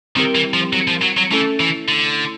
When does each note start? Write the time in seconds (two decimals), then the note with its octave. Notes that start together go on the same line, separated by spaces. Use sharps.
0.16 D#3 G3 C4 E4 G4 A#4
0.35 E3
0.54 F3
0.73 F#3
0.88 F3
1.02 F#3
1.17 F#3
1.31 E3 A3 C#4 E4 A4
1.60 E3
1.89 D3